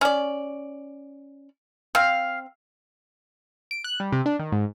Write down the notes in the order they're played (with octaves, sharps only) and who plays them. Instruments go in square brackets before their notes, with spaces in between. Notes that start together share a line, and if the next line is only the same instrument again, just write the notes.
[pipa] C#4 D5
[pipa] C4 [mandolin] F5
[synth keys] D7
F#6
G3
C3
D4
D#3
G#2